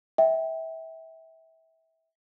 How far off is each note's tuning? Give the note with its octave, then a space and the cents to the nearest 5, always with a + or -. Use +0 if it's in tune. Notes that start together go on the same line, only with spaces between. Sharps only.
E5 -25 G5 +5